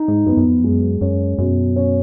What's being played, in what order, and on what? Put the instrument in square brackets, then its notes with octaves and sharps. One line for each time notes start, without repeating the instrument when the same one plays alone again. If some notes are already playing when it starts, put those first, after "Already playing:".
Already playing: [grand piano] D#4
[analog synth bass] G#2
[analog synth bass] F#2 [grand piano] B3
[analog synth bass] F#2
F2
[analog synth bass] F#2 [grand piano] G#3
[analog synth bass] F#2 [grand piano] C#4
[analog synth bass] F#2 [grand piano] B2
[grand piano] C#4